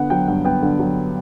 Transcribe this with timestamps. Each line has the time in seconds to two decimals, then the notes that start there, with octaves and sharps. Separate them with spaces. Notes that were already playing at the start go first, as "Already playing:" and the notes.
Already playing: D3 B3 F#5
0.10 F#3 G5
0.28 G2 F#5
0.45 B3 G5
0.62 D3
0.80 F#3